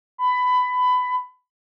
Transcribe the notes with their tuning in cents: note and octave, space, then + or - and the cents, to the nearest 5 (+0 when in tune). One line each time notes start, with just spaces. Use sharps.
B5 +20